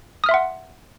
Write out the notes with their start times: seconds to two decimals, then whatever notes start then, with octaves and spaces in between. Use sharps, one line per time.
0.24 D#6
0.26 F6
0.29 E5
0.31 C6
0.34 F#5